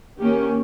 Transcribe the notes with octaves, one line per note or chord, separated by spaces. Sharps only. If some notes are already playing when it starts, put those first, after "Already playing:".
D#3 A#3 C#4 G4